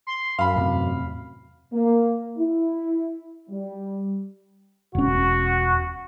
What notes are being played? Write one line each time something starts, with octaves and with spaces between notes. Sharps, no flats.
C6
F#2 F5 B5
E2 A2 C3
A#3
E4
G3
E1 C#4 F#4